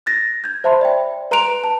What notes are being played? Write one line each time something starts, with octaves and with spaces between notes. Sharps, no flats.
F#6 A6 A#6
G6 G#6
C5 E5 A5 B5 C6
D5 G5
B4 A#5 C6 F#6 D7 F7
A5